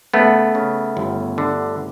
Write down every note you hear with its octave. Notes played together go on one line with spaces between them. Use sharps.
C#3 A3 B3
C#3
G1
D3